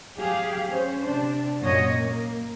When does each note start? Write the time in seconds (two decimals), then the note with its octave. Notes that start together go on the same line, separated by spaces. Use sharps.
0.19 F#3 G4 G#4 F5
0.71 C#4 C5
1.04 C3 D4
1.63 F#2 A#2 F#4 C#5 D#5
1.96 A#3